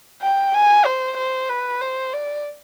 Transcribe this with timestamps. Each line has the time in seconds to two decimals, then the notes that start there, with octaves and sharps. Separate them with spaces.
0.22 G5
0.54 G#5
0.85 C5
1.17 C5
1.49 B4
1.81 C5
2.13 D5